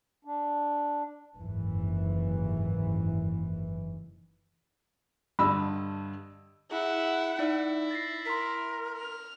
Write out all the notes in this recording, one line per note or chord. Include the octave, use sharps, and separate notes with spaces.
D4
F#1 D#2 G#2 E3
G2 D3 G3 D#5 B5 E6
E4 G#4 F#5
D#4 E4 D5
A6 A#6 C7
A#4 C6 B6
F6